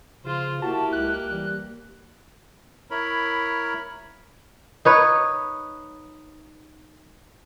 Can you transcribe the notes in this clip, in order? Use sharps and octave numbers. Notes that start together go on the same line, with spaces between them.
C#3 F3 F4 C5
A#3 E4 F#4 G4 A5
C#2 F#6
E3 G3
E4 A#4 C#5 B5
D#4 B4 C#5